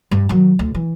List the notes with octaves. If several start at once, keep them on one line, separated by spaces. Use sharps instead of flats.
G2
D#3 F#3
D2
E3